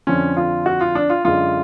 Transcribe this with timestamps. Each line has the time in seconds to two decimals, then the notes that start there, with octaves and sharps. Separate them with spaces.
0.07 F2 D3 F3 C#4
0.37 F4
0.66 F#4
0.81 F4
0.95 D4
1.10 F4
1.24 F#2 D3 G#3 F4